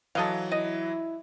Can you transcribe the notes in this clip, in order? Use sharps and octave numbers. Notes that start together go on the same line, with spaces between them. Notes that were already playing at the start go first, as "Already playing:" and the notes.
E3 F#3 A4 D#5 F5
E4 D#5